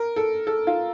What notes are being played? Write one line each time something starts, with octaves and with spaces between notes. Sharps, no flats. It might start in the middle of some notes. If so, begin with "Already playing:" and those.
Already playing: A#4
A4
A4
F4